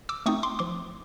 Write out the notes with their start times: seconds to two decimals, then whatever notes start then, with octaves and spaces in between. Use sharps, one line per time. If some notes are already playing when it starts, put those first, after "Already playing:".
0.09 D6 E6
0.26 A3 C4 D#4 C#6 D#6
0.43 C6 D6
0.59 F3 C6 D6